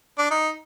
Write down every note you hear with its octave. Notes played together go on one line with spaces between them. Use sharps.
D4
D#4